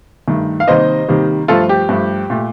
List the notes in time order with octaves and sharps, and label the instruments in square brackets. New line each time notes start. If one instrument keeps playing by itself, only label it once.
[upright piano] G2 D#3 A3
F5
C3 D#3 G3 A#3 C5 D#5
C3 D#3 G3 A#3
G2 F3 A3 F4 A4
G4
G2 F3 A3
A#2 A3